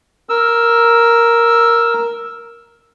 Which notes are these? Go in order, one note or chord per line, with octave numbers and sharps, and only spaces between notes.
A#4 E6